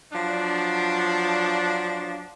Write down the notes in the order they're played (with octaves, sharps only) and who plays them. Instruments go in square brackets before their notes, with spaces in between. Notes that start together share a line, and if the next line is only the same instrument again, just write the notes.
[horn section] F3 F#3 D4